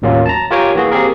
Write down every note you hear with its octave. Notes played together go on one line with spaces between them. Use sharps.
A1 D#2 F#3 A#3 C#4 F4
A5 A#5
F4 G4 A#4 C#5 G5 G#5
E3 A#3 F#4 G#4
A#3 C4 G4 G#4 A#4